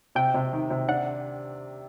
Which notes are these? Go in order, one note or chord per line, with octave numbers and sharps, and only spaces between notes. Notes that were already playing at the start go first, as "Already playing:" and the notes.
C3 G5
C3
D#3
C3
D4 F#5